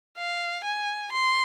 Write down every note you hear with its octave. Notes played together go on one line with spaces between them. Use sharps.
F5
G#5
C6